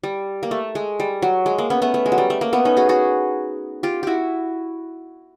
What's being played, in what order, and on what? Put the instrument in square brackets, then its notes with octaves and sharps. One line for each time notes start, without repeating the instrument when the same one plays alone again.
[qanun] G3
A#3
A3
G#3
G3
F#3
G#3
A#3
B3 C#4
A3 B3
A3
G#3
F#3
G3
A3
A#3
A3 B3
C#4 D#4
F#4 G#4
F#4 G#4
F4 G4
E4 F#4 G4